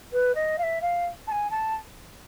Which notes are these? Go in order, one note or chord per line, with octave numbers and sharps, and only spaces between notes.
B4
D#5
F5
E5
F5
A5
G#5
A5